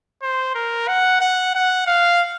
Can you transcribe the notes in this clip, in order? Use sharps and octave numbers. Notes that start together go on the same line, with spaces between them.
C5
A#4
F#5
F#5
F#5
F5